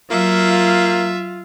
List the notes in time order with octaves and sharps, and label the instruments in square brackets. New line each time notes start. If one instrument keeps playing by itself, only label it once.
[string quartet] F#3 [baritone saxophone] A#3 [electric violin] F4 [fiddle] E5